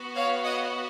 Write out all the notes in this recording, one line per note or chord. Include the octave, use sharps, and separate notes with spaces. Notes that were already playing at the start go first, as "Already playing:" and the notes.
Already playing: B3 F#4
C#5 F5
D#5 F#5